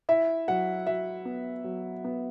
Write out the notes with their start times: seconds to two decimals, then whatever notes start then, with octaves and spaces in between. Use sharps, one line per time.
0.09 E4 E5
0.48 F#3 F#5
0.87 F#3 E5
1.25 B3
1.64 F#3
2.04 B3